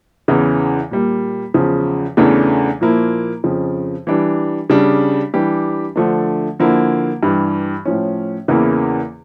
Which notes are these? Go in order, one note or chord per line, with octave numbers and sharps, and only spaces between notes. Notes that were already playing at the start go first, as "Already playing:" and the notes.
E2 C#3 E3
A#2 G3 A#3
E2 C#3 F3
E2 C#3 E3 A3 D4
A#2 F3 A#3 E4
F2 C#3 F3
E3 G3 D4
C#3 G3 D4
E3 G3 D4 G4
D3 F3 A3 D4
D3 F3 A#3 E4
G2 E3 G3
A2 F3 C#4
E2 C#3 E3 A#3 E4